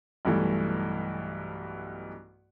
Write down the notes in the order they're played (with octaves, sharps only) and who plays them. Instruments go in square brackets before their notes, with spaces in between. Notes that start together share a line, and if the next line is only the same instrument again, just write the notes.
[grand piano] B1 G2 E3 A3